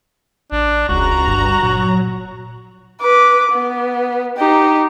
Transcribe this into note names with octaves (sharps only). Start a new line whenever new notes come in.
A1 D4
E1 C#2 F#4 A#5
G1 G2
A#2 F#3
B4 D6
B3
D#4 G4